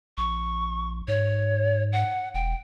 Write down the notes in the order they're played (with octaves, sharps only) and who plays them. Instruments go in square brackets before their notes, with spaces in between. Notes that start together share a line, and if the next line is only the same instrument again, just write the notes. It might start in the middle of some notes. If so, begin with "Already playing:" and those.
[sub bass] A#1 [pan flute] C#6
[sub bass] G#2 [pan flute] C#5
[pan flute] F#5
[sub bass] E1 [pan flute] G5